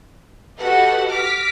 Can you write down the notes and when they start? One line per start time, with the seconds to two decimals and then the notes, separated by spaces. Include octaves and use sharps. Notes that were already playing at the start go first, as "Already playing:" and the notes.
0.58 F#4 G4 A4 B4 D#5 F#5
1.10 D6 F6 A#6 B6